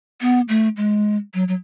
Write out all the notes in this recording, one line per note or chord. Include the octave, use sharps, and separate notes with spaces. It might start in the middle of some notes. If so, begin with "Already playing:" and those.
B3
A3
G#3
F#3
F#3